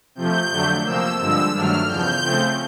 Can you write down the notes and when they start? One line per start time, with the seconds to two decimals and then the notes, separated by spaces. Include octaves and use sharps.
0.15 C3 F3 A3 G6
0.50 F2 D3 F#3 A3 D4
0.84 C3 F3 A#3 E6
1.19 G2 D3 F3 G#3 E6
1.53 G2 D#3 F#3 A3 D4 F6
1.87 E2 C#3 F3 G6
2.21 C#3 F3 A3 C4